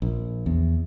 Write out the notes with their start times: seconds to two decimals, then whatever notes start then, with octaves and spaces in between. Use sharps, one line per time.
0.02 A#1
0.46 E2